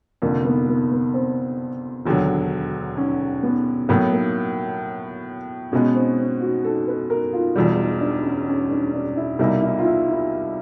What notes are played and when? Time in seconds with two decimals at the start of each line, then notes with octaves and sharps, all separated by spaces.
0.22 F1 F2 D3 A#3
0.45 B3
0.68 B3
0.92 B3
1.14 C4
2.06 E1 D#2 D3 F#3
2.97 C#4
3.43 B3
3.89 A2 F#3 A#3 B3
4.13 A#3
5.72 B2 G#3 B3 C#4
5.95 C4
6.19 C4
6.41 F#4
6.64 A4
6.87 B4
7.10 A#4
7.33 F4
7.56 E1 E2 B2 G3 F4
7.79 D#4
8.01 D4
8.24 C#4
8.48 C#4
8.71 D4
8.93 D4
9.16 E4
9.39 C2 B2 G3 A#3 D#4 E4
9.62 E4
9.78 F4
9.84 E4
10.09 E4